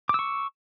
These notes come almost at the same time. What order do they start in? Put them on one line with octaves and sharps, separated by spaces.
D6 E6 C#6